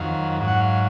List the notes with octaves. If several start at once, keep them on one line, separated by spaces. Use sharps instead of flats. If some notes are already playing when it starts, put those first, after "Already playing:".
Already playing: F2 D#3 F#3 F5
G#2 F#3
F#5
F5